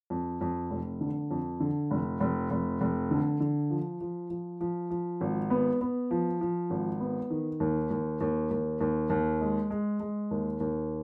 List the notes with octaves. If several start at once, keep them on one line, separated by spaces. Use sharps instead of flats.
F2
F2
F1
D3
F2
D3
F1
F1
F1
F1
D3
D3
F3
F3
F3
F3
F3
G#1
B3
B3
F3
F3
G#1
B3
D#3
D#2
D#2
D#2
D#2
D#2
D#2
G#3
G#3
G#3
D#2
D#2